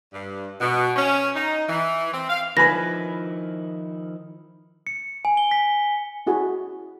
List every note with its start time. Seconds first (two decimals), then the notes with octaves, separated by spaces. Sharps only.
0.13 G2
0.61 B2
0.96 C#4
1.35 D#4
1.69 E3
2.13 C4
2.29 F5
2.57 D#3 F3 E4 B4 G#5 B5 A#6
4.87 C#7
5.25 G#5
5.37 G7
5.51 B6
6.27 E4 F#4 G#4